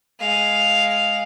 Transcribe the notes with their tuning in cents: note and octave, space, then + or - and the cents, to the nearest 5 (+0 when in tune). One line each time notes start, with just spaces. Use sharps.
G#3 +0 F5 +0